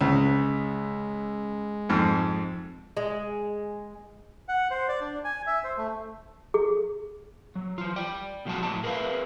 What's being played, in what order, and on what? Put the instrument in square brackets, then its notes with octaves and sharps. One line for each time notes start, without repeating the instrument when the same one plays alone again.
[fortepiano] C#2 [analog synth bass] G#3
[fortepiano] F2 G#2
[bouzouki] G#3
[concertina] F#5
C5
D5
D4
G#5
E5
C5
A3
[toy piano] G#4
[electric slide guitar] F#3
E3 F4
D5 G5
B2 F3 F#3 G#3 F#4 A5
A2 E4 D#5 A5
G#4 A#4 B4 E5 F5